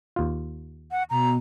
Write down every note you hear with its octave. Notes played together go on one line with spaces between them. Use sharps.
D#2 F4
F#5
B2 A#5